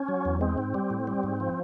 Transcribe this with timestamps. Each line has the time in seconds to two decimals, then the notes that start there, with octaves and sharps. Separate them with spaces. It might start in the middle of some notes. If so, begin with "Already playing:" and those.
Already playing: C#4
0.08 F#3
0.25 E2
0.41 G#3 C4
0.58 G#2
0.74 G3
0.90 A2
1.07 G3
1.23 G#2
1.40 F3